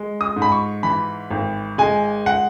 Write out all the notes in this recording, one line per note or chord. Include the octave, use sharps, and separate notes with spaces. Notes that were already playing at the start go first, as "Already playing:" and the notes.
Already playing: G#3
D#6
G#2
B5
C#6
E3 B5
G#1
G#3 G#5
F#5